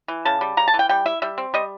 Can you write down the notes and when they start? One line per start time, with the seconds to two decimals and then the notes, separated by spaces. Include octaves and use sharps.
0.08 E3
0.25 C#3 A5
0.41 G3
0.57 C#3 A#5
0.68 A5
0.74 E3
0.79 G5
0.89 G3 G5
1.06 E4 E5
1.22 G3 E5
1.38 C4
1.54 G3 D#5